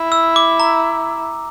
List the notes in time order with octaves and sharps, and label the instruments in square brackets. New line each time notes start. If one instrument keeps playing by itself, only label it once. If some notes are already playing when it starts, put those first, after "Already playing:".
Already playing: [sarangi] E4
[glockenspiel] E6
D6
A#5